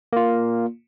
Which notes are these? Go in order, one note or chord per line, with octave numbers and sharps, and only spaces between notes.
A#3 F4